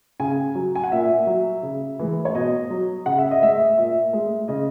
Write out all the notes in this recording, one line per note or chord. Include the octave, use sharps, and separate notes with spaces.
C#3 G#5
F#3
G#5
F#5
A#2 E5
F#3
C#3
E3 G#3
C#5
B2 D#5
F#3
C#3 F#5
E5
D#5
G#3 E5
A#2 E5
G#3
C#3 D#5